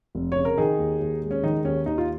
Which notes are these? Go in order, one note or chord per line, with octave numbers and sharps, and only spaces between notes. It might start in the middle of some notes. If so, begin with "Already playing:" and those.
F1
C#3 C#5
A#4
D#3 D#4 G#4
D#2
D#2
G#3
C#4
D#3 D#4
D#2 C#4
D#2 D#4
F4